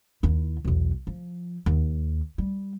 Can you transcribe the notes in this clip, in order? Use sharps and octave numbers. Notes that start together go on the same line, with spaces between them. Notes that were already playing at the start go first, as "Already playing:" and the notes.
D#2 E4
B1 E2
F3
D#2
G3